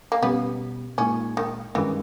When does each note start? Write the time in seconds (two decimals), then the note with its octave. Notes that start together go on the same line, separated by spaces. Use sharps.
0.12 A#3
0.22 B2 G3 B3 C#4 G4
0.98 A#2 G#3 C#4 D#4
1.37 D#3
1.75 G2 D#3 E3 G#3 C#4